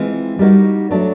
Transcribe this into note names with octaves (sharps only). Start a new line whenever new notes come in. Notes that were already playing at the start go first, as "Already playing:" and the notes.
Already playing: E3 G#3 C4 F4
G3 A#3 D#4 F#4
F#3 A3 D4